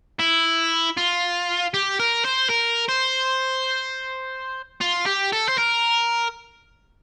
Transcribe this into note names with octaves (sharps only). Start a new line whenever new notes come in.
E4
F4
G4
A#4
C5
A#4
C5
F4
G4
A4
C5
A#4